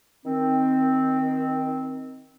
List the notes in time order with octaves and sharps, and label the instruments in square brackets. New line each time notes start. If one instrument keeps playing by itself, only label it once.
[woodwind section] D#3 C4